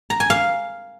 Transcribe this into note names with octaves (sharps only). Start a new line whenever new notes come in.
A#5
G#5
F5